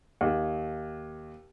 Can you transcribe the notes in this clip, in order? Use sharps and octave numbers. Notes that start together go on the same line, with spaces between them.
D#2